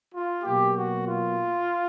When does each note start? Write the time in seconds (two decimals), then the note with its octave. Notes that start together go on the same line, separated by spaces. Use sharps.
0.12 F4
0.43 B2 F#3 A#3 G4
0.73 F#4
1.04 F4